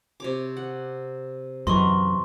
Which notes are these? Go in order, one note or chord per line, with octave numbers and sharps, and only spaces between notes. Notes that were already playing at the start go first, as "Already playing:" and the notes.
C3 C#5 D6
F#5
F#2 E3 A#4 D#5 C6 C#6